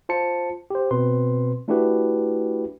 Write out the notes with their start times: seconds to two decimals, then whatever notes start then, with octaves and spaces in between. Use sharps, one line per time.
0.09 F4 C5 A5 C#7
0.70 G4 C5
0.91 B2 C4 B4 C6
1.68 A3 D4 E4 F#4 G4 B4